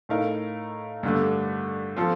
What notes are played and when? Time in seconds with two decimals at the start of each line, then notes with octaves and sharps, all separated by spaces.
0.09 A2 A3 D#4 A#4 F5
1.03 G2 D3 A3
1.96 F3 C4 F4 A4